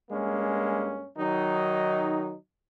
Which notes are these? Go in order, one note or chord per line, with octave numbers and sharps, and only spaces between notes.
G2 G#3 A#3 C#4
D#3 F#3 D#4